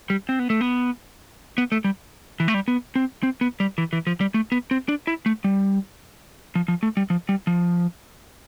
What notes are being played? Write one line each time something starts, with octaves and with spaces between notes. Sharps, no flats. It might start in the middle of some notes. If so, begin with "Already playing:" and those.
G3
C4
B3
A3
B3
B3
A3
G3
E3
A3
G3
B3
C4
C4
B3
G3
E3
E3
F3
G3
A3
B3
C4
D4
E4
A3
G3
F3
F3
A3
G3
F3
G3
F3